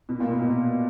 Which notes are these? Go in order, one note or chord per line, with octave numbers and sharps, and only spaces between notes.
B2
A#2
B2